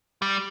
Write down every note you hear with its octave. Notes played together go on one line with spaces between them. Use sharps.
G3